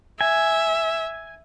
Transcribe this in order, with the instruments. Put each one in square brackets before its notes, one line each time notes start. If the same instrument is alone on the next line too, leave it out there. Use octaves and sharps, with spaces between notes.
[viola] E5 [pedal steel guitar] G#5